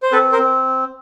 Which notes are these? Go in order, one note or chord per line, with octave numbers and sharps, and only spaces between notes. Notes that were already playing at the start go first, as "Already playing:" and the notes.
C5
C4 A4 B4
A#4 C5
C4